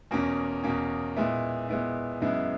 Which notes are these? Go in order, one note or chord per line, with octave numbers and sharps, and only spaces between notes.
E2 B2 A#3 C#4
E2 B2 A#3 C#4
A#2 G#3 B3 E4
A#2 G#3 B3 E4
F#2 C#3 G#3 B3 E4